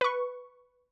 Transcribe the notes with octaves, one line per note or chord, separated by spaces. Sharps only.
B4 C#6